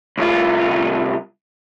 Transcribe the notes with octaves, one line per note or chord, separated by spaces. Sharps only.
C2 F4